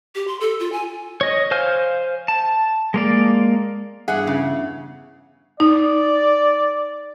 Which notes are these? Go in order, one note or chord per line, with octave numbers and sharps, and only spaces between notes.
G4
C6
A4
F4
G#5
C#5 D#5
C5 F5 G#5 F6 G6
A5
G#3 A#3 D5
E2 G2 G#4 E5 F#5
C#3
D#4 D5